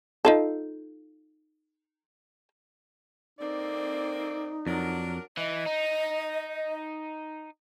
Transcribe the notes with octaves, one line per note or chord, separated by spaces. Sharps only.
D#4 F4 A4
D3 A#3 C4 D#4 D5
F2 F#3 D4 A#4
E3 D#5
D#4